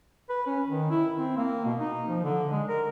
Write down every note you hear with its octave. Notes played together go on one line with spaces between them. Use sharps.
B4
C#4
D#3
E4
C4
A#3
B2
D#4
F3
D3
G#3
A#4